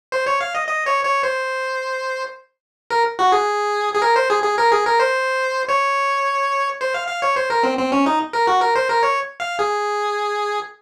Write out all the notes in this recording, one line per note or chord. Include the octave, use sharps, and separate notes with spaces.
C5
C#5
F5
D#5
D#5
C#5
C#5
C5
A#4
F#4
G#4
G#4
A#4
C5
G#4
G#4
A#4
G#4
A#4
C5
C#5
C5
F5
F5
C#5
C5
A#4
C4
C4
C#4
D#4
A#4
F#4
A#4
C5
A#4
C#5
F5
G#4